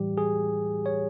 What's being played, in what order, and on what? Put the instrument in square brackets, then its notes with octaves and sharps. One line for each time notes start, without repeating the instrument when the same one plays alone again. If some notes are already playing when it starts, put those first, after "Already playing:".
Already playing: [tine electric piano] A2 E3 G3 G4
G#4
C#5